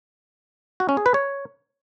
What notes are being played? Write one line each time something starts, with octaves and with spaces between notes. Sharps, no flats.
F#4
C#4
G#4
B4
C#5